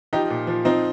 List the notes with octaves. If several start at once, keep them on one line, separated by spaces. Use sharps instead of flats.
F3 D#4 G4
A#2
F3
F3 C4 D#4